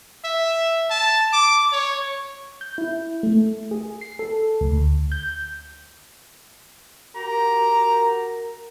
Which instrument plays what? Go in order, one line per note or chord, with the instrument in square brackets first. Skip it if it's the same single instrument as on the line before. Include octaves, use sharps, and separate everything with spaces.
[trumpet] E5
A5
D6
C#5
[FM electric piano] G6
E4
A3
G#4
C7
A4
D2
G6
[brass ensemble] F#4 A#4 [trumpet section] G4 A#5